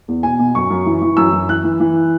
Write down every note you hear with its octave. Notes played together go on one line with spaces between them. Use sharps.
E2
B2 G#5
B2
F#2 C#6
F#2
E3
E3
F#2 E6
F#2
E3 F#6
E3
E3